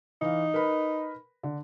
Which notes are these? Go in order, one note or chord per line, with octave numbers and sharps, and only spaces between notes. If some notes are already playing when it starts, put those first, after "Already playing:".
E3 D#4 F5
A#4 B4 B5
D3